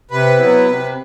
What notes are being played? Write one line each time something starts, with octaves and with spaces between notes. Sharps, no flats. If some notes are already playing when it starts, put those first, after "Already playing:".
C3 B4
F#3 B3 E4
C3